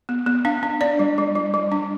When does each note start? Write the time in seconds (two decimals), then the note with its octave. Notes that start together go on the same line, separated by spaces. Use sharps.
0.09 B3
0.26 B3
0.45 D4 F5
0.63 D4
0.81 D4 D5
0.99 G3
1.18 G3
1.35 G3
1.54 G3
1.72 D4